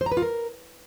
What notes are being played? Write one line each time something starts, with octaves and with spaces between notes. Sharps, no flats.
C5
A#5
B4
F4
A#4